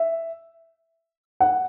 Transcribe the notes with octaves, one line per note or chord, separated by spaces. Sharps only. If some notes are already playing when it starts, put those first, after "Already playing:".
Already playing: E5
F#5